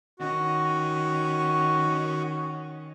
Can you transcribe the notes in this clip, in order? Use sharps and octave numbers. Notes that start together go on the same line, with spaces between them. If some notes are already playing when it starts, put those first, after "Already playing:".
D#3 C#4 F#4